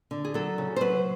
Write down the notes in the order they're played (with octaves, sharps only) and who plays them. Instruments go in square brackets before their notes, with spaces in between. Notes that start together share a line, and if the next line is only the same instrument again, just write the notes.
[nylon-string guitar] D3
G#4
F#3 A4
C#3
C5
F#3 B4